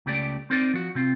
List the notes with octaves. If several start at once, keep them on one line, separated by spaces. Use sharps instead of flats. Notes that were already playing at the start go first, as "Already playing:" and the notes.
C#2 C#3 A3 G4 A4 D5
C4 D#4 A#4 C5 D5
F3 F#4
C3 C4 F4